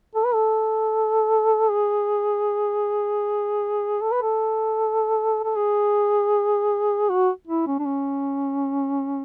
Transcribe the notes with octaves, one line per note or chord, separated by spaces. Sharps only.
A4
B4
A4
G#4
A4
B4
A4
A4
G#4
F#4
E4
C#4
D4
C#4